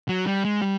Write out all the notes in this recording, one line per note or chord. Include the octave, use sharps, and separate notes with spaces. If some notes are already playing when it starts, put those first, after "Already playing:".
F#3
G3
G#3
G3